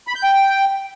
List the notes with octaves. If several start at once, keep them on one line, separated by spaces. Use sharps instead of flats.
B5
G6
G5